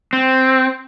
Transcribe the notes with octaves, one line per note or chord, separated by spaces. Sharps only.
C4